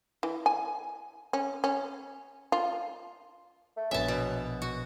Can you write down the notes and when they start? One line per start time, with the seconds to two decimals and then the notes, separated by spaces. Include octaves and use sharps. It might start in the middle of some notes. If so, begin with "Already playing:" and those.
0.23 E3
0.46 G#5
1.33 C#4
1.64 C#4
2.52 F4
3.77 A3
3.91 A#1 F#3 B3 E5 G#5 A5
4.08 B2
4.62 F#4